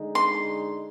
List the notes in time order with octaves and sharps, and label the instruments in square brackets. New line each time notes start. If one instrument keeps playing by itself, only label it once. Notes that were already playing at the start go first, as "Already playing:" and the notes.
Already playing: [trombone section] D3 G#3 D#4
[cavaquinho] C6